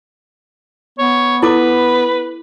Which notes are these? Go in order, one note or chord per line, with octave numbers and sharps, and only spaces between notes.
B3 C#5
E4 A4 B4 D6